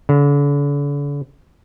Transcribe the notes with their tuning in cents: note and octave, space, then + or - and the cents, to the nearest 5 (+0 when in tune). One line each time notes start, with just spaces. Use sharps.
D3 -40